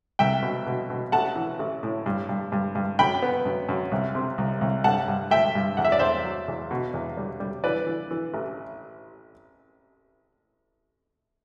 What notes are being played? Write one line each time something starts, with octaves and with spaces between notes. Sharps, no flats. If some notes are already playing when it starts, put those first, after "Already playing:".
C2 E5 G5
B2
B2
B2
A1 F#5 A5
E3
A1
A2
G2
G2
G2
G2
F#2 G5 B5
B3
F#2
F#2
C2
C3
C2
C2
G2 F#5 A5
G2
A3 E5 G5
G2
E2 F#5
E5
D5
E2 C5 E5
F#3
E2
B2
E2
G3
G3
E3 B4 D5
E3
E3
A1